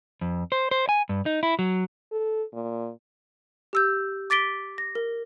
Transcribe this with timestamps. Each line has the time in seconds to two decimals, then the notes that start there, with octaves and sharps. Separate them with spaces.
0.21 F2
0.52 C5
0.71 C5
0.89 G#5
1.09 G2
1.26 D#4
1.43 E4
1.59 F#3
2.12 A4
2.53 A#2
3.73 G4 E6 G6
4.30 D6 A6 B6 D7 G7
4.78 A#6
4.95 A#4